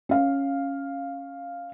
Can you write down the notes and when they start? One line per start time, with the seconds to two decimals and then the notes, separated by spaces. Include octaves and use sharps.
0.09 C#4 F5